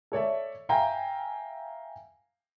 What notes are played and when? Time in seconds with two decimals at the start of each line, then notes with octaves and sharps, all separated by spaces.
0.12 A4 C#5 D5 E5
0.69 E5 F5 G5 G#5 A#5